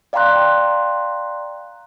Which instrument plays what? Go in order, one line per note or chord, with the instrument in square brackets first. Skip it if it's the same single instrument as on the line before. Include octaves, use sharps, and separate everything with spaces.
[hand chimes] D5 F5 G5 A#5 C6 F#6